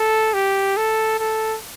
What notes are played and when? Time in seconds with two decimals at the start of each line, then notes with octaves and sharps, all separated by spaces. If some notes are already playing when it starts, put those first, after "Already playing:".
Already playing: A4
0.34 G4
0.77 A4
1.19 A4